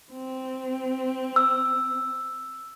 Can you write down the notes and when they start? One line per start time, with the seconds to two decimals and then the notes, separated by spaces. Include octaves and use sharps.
0.12 C4
1.36 E6